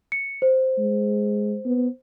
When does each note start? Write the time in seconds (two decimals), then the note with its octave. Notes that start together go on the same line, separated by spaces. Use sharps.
0.12 C#7
0.42 C5
0.78 G#3
1.65 B3